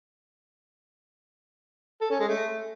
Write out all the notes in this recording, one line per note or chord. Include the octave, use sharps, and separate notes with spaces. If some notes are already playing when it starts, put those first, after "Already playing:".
A4
C#4
G#3
A3